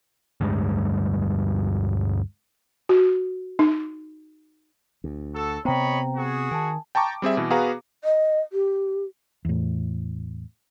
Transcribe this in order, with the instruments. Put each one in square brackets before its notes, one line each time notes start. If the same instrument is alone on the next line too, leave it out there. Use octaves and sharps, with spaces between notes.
[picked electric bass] D2 G2 G3 G#3
[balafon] F#4
D#4
[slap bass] D2
[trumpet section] F#4 A4
[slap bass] C3 B3 [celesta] C5 G5 A#5 [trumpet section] C#5 D#5 B5
[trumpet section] F#4 G#4
[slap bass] D#3 [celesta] G#5 A5
[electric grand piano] G5 A5 A#5 C#6 D6
G3 C4 G#4 E5
B2 E3
B3 F#4 G#4 B4 F5 A#5
[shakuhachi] D#5
G4
[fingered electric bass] E2 A2